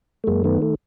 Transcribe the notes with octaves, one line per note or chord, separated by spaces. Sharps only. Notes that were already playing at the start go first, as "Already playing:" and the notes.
A3
F#2 G#3 A#3
D#3 A3 B3
A3